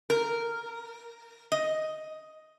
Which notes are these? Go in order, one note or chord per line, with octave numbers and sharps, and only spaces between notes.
A#4
D#5